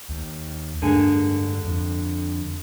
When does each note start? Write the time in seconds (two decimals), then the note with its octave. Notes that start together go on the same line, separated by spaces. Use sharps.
0.09 D#2
0.82 G2 D3 G#3 A#3 G#4
1.65 F2